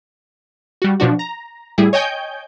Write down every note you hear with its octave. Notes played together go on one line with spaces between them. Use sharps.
G3 F#4
B2 F3 D4 F#4
A#5
A2 G3 E4 G#4
C#5 D#5 G5 G#5 G6